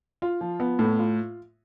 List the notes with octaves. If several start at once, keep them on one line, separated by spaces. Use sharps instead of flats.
F4
F3
B3
A2
F4